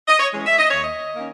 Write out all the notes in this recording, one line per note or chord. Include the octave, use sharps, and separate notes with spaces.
D#5
C#5
E3 G#3 C#4
E5
D#5
D#2 C#5
D#5
D#3 A#3 C#4